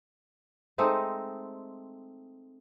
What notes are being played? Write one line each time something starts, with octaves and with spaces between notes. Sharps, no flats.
G#3 A3 C4 D#4